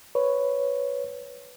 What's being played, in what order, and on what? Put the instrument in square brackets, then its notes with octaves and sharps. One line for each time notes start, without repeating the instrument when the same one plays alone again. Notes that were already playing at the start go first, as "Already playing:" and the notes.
[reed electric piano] B4 C#5